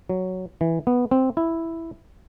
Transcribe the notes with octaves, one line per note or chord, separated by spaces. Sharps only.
F#3
E3
B3
C4
E4